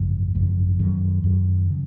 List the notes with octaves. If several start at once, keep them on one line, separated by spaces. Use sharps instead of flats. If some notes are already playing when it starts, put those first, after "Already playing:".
Already playing: G#1 F#2 C#3 F3
G#1 F#2 C#3 F3
F#2 D#3 F#3
F#2 D#3 F#3
C#3 F3